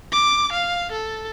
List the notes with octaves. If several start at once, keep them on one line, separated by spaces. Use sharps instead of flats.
D6
F5
A4